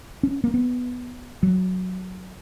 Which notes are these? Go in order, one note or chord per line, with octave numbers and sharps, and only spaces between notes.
C#4
A#3
B3
F#3